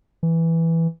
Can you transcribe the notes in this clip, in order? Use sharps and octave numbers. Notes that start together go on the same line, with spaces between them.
E3